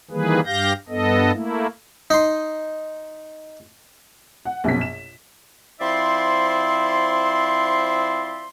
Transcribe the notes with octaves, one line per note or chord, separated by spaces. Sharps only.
D#3 E3 G3 A#3 G#4 B4
G2 G4 F5 G6 A#6
G2 B3 A4 D#5
A3 A#3 E4
D#4 C6
F#5
A#1 F#2 B2 B6
E7
F3 C4 E4 D5 E5 C6